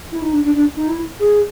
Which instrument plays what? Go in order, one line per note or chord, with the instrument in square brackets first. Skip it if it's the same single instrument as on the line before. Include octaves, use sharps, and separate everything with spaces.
[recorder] E4
D#4
D4
D4
D4
D#4
E4
G#4